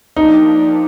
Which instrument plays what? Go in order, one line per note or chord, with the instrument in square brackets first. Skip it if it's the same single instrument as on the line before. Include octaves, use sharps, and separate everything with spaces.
[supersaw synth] F3 A#3 D4 G4 [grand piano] D#4